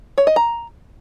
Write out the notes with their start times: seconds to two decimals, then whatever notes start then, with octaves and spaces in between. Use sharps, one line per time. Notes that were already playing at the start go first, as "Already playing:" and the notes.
0.18 C#5
0.27 D#5
0.36 A#5